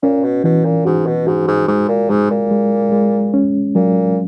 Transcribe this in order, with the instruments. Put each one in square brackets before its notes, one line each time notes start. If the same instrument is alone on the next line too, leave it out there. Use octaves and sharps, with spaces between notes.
[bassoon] A#2 [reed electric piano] C#4
[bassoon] B2
[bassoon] B2 [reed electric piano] E3
[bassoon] A#2
[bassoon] G#2 [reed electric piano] F#4
[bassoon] B2
[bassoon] G#2 [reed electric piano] F#4
[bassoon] G#2
[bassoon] G#2 [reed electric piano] G#3
[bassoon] A#2
[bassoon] G#2 [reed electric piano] G#3
[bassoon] A#2
[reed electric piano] G#3
G#3
C#4
[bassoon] A#2 [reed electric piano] F#3